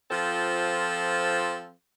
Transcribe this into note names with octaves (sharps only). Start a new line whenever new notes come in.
F3 C4 F4 A4